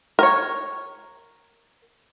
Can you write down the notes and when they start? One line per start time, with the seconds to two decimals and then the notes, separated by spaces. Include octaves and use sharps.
0.19 A#4 C#5